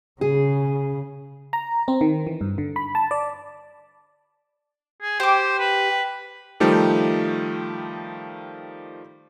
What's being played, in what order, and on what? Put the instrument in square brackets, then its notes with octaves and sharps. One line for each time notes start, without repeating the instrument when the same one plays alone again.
[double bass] C#3 [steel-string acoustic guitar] G#4
[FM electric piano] A#5
C4
D#3
E3
G2
D3
B5
A5
D5
[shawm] G#4
[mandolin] G4 D6 [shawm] C5
[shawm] B4
[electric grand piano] D#3 F3 G3 A3 D#4 G4